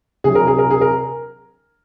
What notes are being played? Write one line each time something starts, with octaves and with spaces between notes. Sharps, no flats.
C3 F#3 G#4
A#4
G#4
A#4
G#4
A#4